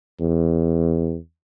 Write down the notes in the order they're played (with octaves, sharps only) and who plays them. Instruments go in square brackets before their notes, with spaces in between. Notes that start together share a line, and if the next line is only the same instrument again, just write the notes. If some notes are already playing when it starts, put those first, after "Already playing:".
[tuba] E2